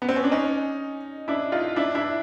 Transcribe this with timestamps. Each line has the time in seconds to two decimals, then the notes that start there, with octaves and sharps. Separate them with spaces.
0.02 B3
0.09 C4
0.16 C#4
0.24 D4
0.31 C#4 D#4
1.28 D4 E4
1.52 D#4 F4
1.76 D4 E4
1.95 D4 E4